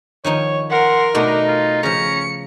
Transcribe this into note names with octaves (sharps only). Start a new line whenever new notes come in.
D#3 F3 D#4 C#5 C#6
A#4 F#5 C6
B2 A3 B3 D4 D#4
F4
C#3 F3 C#4 A#5 C#7